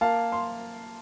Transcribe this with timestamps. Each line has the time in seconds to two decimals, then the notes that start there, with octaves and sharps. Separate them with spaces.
0.01 A#3 F5 A5
0.32 C6